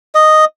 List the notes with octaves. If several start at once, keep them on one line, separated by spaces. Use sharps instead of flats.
D#5